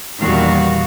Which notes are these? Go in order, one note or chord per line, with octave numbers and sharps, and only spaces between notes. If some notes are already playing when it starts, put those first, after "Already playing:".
E2 A#2 D#3 G3 F#4 F5